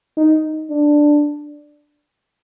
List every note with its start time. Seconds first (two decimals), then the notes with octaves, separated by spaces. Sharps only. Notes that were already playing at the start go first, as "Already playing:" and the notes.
0.17 D#4
0.70 D4